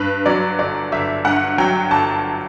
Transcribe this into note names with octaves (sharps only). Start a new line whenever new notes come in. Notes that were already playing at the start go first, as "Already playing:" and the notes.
Already playing: G2 B4
F#3 D5
G1 D5
G1 E5
G2 F#5
F#3 G5
G1 A5